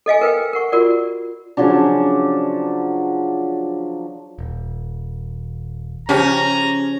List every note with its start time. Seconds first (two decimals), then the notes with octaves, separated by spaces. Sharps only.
0.06 A4 D#5 F5 G#5
0.21 A#4 B4 F5 G5
0.53 A#4 F#5 C#6
0.72 F4 F#4 A#4 D5
1.57 C#3 F3 F#3 D4
4.39 D#1
6.09 C#3 F3 C#4 G4 A#5